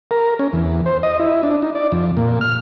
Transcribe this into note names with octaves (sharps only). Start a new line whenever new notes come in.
A#4
C#4
E2
C5
D#5
E4
D4
D#4
D5
F2
A#2
F6